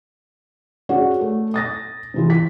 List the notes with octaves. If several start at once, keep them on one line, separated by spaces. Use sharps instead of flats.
C#4 F#4 G#4 D5 F#5
A3
D#6 A6 A#6
C3 E3 F4
B6